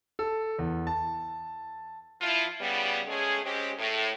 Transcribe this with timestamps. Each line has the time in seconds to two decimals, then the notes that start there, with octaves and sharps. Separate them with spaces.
0.19 A4
0.59 E2
0.87 A5
2.22 F3 E4 F4
2.61 C#3 G3 B3
3.08 G#3 A3 C#4 G#4
3.44 G#3 C4 C#4 G4
3.79 A2